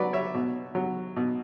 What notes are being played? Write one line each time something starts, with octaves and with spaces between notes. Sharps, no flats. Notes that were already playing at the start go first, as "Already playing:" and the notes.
Already playing: F#3 B4 D5
C#5 E5
B2
F#3
B2